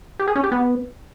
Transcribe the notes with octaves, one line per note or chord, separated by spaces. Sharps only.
G4
G#4
C#4
G4
B3